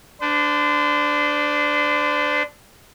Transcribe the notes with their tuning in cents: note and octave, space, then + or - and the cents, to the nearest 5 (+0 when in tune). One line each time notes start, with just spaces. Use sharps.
D4 +0 C5 -35